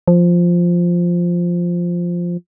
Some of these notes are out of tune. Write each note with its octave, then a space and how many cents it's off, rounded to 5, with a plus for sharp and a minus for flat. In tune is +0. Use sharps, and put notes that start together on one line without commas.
F3 +0